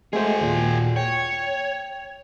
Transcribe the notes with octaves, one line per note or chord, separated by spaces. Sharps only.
G#3 A3 F#4 G#4 C5
D#2 A#2
C#5 G5